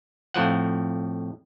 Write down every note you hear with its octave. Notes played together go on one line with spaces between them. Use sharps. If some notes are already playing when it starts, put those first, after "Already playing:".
F2 A2 F3 F#5